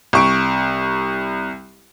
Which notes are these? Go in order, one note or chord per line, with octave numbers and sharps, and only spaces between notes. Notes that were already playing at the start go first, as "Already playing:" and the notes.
C2 C#6 D7